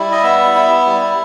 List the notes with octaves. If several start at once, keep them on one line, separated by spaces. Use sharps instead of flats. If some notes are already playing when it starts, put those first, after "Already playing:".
Already playing: G3 E4
D#5
B3 E5
E4
G3